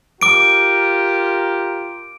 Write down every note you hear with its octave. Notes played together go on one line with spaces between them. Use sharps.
F4 G4 A#4 D6 D7